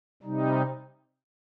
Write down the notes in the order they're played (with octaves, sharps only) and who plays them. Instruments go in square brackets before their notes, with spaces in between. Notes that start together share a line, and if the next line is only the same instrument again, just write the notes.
[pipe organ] C3 G3 D#4